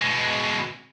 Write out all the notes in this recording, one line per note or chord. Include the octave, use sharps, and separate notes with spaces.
B2 G#3